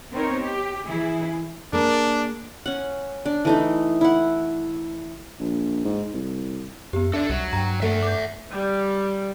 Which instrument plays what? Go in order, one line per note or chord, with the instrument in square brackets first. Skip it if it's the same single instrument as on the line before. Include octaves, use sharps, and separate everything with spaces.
[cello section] B3 C4 D#4 A#4 C5 C#5
G4
E3 E4 G#4
[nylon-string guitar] A#3 G#4 A#4 [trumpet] D4
[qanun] C#4 F#5
D4
E3 A3 D#4
E4 F#5
[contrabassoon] A#1
G#2
C2
[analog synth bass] F#2 [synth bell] B3 G4
[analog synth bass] D4 [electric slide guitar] A4 D5 [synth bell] E5
[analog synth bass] C2 [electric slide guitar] F#3
[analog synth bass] G2 [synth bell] G5 A#5
[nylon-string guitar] A3 [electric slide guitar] E5 F#5
[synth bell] D6 G6
[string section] G3